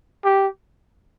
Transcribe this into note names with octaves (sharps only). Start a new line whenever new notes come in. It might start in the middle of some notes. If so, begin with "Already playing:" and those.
G4